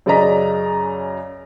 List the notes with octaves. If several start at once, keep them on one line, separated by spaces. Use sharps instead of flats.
F#2 C#3 D5 D#5 A#5 B6